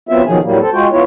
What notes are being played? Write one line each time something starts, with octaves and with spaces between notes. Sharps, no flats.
F#3 B3 C4 F4 E5
B2 D#3 F3 F#3 G#4
A2 F#3 G3 A#3
C4 A4
G#3 F4 F#4 G5
B3 E4 F4 C#5